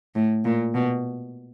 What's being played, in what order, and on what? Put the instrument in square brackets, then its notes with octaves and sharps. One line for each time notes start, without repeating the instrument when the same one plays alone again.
[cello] A2
A#2
B2